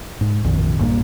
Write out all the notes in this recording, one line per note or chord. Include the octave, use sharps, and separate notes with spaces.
G#2
A#1 F2 A#2 D#3
A#1 G2 A#3